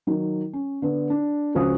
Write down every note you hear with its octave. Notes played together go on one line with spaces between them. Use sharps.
D#3 F#3
C#4
D3 B3 D4
D4
C#2 F3 C#4 F#4 C5 D#6